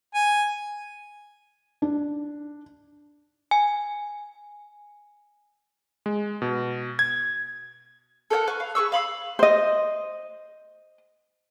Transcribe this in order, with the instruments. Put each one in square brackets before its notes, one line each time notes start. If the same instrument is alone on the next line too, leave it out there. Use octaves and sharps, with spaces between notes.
[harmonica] G#5
[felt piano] D4
[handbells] G#5
[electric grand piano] G#3
B2
G#6
[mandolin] A4 A#4 C#5 F#5
B4 C#6
F5
G#4 B4 C#6 E6
F5 B5 C6 E6
[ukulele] C5 D#5